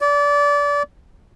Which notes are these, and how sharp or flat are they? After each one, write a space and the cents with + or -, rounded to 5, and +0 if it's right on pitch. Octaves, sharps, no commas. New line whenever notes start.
D5 -25